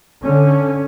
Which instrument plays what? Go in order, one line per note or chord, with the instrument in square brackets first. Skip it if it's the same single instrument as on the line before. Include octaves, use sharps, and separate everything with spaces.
[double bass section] D3 C#4